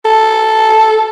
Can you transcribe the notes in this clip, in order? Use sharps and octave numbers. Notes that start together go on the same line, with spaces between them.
A4